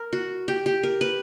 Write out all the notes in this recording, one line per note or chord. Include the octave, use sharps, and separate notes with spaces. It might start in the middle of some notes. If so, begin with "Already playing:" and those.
Already playing: A#4
F#4
G4
G4
A#4
B4